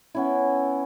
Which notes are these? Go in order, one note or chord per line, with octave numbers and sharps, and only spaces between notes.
B3 C#4 E4